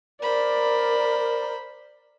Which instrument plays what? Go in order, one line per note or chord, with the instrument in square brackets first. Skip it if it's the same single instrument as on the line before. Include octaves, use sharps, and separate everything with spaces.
[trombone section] A#4 [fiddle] C5 B5 [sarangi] D5